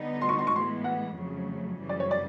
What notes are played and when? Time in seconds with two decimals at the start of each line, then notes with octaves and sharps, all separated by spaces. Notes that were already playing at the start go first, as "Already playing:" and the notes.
Already playing: D3 G3 B3 D#4
0.21 C6
0.29 C#6
0.39 C6
0.47 C#6
0.52 A2 E3 G#3 B3 C6
0.84 F#5
1.16 F2 C#3 F#3 A3
1.79 F#2 C#3 E3 G3
1.89 D5
2.00 C#5
2.11 D5